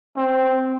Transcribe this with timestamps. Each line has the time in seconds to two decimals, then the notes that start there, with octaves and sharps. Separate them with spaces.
0.16 C4